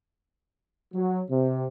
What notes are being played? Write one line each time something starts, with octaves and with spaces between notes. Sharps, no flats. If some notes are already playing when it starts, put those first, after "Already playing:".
F#3
C3